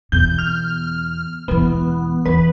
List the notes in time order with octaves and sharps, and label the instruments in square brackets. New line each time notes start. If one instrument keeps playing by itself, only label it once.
[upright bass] E2 B2 [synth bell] G6
[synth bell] F6
[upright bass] E1 E3 [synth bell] B3
[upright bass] E2 E3 [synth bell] B4